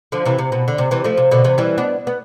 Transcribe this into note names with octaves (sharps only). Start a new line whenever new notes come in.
D3 F3
C3 E3
C3
B2
D3
C3
C3 E3
F3 A3
C3
B2 D3
C3 E3
E3 G3
B3 D4
B3